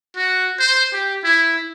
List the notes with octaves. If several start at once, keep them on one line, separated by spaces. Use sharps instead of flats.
F#4
C5
G4
E4